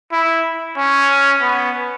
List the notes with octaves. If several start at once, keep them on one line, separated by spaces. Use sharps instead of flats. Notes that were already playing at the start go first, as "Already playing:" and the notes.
E4
C#4
B3